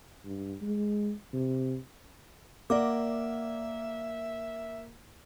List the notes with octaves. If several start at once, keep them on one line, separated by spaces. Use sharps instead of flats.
G2
G#3
C3
A#3 D5 E5 F#5 D6